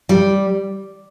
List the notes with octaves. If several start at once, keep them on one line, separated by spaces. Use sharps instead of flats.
G3